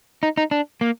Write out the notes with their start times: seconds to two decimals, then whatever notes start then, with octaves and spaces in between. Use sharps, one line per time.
0.23 D#4
0.37 D#4
0.51 D4
0.81 A#3